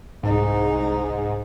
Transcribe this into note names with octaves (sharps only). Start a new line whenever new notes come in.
C2 G#2 D#4